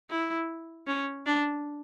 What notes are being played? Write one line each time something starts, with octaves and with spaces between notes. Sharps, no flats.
E4
C#4
D4